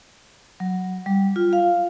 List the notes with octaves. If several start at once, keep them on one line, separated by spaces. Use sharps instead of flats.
F#3
G3
F4
F5